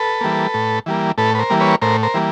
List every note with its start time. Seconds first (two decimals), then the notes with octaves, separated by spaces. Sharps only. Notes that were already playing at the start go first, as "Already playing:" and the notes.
Already playing: A4 B4
0.21 E3 G3 A#3
0.54 A2
0.86 E3 G3 A#3
1.18 A2 A4 B4
1.35 B4
1.39 A#4 C5
1.50 E3 G3 A#3
1.60 B4 C#5
1.82 A2 A#4 C5
2.03 A#4 C5
2.14 E3 G3 A#3